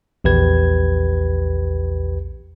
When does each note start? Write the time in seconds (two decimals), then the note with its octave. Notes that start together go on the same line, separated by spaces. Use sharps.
0.24 A#1 E2 G4 B4 G#6